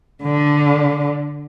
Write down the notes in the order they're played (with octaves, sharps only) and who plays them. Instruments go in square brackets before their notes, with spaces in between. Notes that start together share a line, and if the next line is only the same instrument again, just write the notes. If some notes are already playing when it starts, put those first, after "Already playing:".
[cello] D3